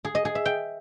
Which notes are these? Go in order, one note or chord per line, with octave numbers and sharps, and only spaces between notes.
G#4
D#5
G#4
E5
G5